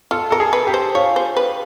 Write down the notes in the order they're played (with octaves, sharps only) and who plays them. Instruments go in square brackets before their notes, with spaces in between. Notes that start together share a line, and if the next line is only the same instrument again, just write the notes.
[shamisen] F4 [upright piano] A4
[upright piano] A4 [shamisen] A#4
[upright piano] G#4
[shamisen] B4
[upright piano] G4
[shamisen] C5
[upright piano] F4 [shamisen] C#5
[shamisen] C5
B4